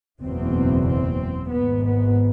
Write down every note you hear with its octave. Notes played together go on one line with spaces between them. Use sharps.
F#1 E2 B2 C4
C4
G#1 G#2 B3
B3